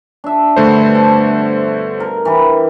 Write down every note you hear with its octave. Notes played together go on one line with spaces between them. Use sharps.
D4 E5
G2 B2 D3 A3 C5
A5
A#4
E3 G4